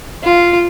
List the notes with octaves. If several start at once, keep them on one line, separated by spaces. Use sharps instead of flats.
F4